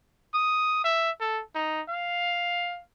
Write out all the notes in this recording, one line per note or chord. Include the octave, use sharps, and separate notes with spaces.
D#6
E5
A4
D#4
F5